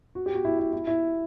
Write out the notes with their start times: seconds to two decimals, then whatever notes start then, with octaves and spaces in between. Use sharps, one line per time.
0.15 F#4
0.26 G4
0.35 F#4
0.45 E4
0.59 E4
0.73 E4
0.87 E4